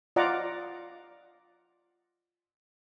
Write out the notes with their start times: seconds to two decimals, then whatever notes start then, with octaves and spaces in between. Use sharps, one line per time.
0.16 F4 D5 D#5 F#5 A#5 D6